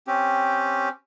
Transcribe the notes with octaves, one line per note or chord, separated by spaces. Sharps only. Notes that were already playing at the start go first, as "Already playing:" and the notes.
C4 C#4 G4